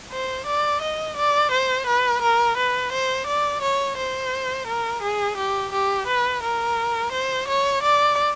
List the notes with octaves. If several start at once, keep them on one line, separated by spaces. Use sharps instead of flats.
C5
D5
D#5
D5
C5
B4
A#4
B4
C5
D5
C#5
C5
A#4
G#4
G4
G4
B4
A#4
C5
C#5
D5